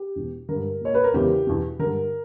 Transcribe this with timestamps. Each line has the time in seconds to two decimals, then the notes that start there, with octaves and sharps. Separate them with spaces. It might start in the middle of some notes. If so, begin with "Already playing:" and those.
Already playing: G4
0.16 E2 B2
0.49 G2 D3 A#4
0.81 A#2 C#5
0.94 B4
1.04 A#4
1.14 E2 C#3 E3 G4
1.47 E2 B2
1.79 G2 D3 A#4